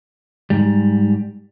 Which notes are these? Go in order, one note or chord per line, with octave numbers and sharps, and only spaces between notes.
G#2 G3